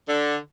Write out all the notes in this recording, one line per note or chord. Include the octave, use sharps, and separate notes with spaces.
D3